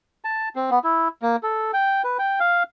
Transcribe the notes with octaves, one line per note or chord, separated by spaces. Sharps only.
A5
C4
B3
E4
A#3
A4
G5
B4
G5
F5